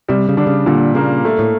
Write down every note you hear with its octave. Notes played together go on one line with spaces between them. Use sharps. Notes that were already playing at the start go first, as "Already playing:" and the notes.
C3 G3
C#3
D3 D4
C#3
A#2 D3
C#3 A#3
A3
A2